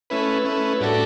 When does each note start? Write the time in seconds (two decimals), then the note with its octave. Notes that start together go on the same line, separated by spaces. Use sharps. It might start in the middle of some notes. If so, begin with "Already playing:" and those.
0.10 A3 C#4 E4 B4
0.45 A3 C#4 E4 B4
0.80 A2 G3 D4 F#4 A4